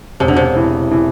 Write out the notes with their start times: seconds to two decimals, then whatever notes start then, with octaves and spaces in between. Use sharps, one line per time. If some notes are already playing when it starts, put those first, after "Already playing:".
0.20 E1 C3
0.28 D3
0.37 C3
0.56 E3
0.91 E3